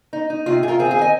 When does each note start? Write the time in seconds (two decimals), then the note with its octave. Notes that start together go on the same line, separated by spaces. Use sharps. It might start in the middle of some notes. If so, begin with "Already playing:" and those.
0.13 D#4
0.30 D#4
0.46 C3 F4
0.63 C3 G#4
0.68 F4 A#4
0.79 C4 G#4
0.85 F4
0.91 G#4
0.96 D#3
1.01 D#5 G#5